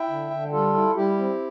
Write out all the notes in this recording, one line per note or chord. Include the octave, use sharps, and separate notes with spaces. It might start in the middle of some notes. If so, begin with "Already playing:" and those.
Already playing: E4 E5 G5
D3
D3
G3 F4 A4
E4
G3 E4 G4
C4